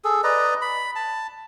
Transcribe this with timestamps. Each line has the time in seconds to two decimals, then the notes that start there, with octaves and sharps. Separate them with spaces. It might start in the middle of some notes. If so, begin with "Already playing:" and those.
0.04 G#4 A4
0.24 B4 D5 D#5 A#5
0.61 B5
0.96 A5